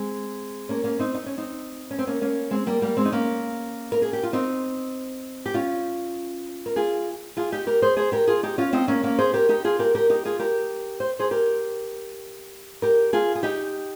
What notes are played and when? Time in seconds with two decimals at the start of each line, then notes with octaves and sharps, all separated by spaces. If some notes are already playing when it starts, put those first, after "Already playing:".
Already playing: G#3 C4
0.69 A#3 C#4
0.84 A#3 C#4
0.99 C4 D#4
1.14 D#4
1.26 C#4
1.37 C4 D#4
1.91 C#4
1.99 C4
2.07 A#3 C#4
2.21 A#3 C#4
2.51 G#3 C4
2.66 G3 A#3
2.82 G3 A#3
2.97 G#3 C4
3.05 D#4
3.12 A#3 C#4
3.92 A#4
4.02 G#4
4.13 G4
4.23 F4
4.33 C4 D#4
5.46 G4
5.54 C#4 F4
6.66 A#4
6.76 F4 G#4
7.37 F4 G#4
7.52 D#4 G4
7.67 G4 A#4
7.82 G#4 C5
7.97 G#4 C5
8.12 G4 A#4
8.27 F4 G#4
8.43 D#4 G4
8.58 C#4 F4
8.73 C4 D#4
8.88 A#3 C#4
9.03 A#3 C#4
9.19 G#4 C5
9.33 G4 A#4
9.49 D#4 G4
9.64 F4 G#4
9.79 G4 A#4
9.95 G4 A#4
10.10 D#4 G4
10.25 F4 G#4
10.39 G4 A#4
11.00 C5
11.19 G#4 C5
11.31 G4 A#4
12.82 G4 A#4
13.13 F4 G#4
13.35 G#4
13.43 D#4 G4